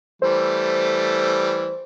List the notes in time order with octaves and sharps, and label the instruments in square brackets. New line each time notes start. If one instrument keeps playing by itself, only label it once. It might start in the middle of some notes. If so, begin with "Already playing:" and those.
[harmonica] E3 G3 A3 [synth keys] C5